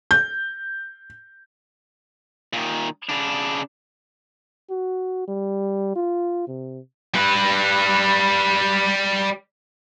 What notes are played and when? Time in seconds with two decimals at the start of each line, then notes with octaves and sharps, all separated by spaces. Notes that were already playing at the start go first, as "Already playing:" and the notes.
0.11 G6
2.53 A#2 D#3
3.09 C#3 D4
4.70 F#4
5.28 G3
5.96 F4
6.48 C3
7.14 G3 B4